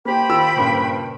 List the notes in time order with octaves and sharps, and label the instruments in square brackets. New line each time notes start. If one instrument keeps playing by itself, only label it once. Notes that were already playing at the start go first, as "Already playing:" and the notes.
[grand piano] A#3 G4 [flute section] C5 G5 B5
[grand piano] D#3 F4 E6
G2 A#2 C#3